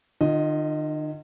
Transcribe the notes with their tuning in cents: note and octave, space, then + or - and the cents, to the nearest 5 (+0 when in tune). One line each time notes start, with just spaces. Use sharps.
D#3 -45 F4 +0 D#5 +0